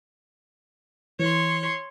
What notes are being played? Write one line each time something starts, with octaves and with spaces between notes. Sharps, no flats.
E3 C#5 C6